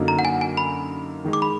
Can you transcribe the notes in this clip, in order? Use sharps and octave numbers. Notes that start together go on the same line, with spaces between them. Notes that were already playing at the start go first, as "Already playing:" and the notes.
Already playing: F#2 D3 F#3 A#3 D#4
A#5
F#5
G#5
G#5
B5
D#3 G#3 D#4 G#4
D6
B5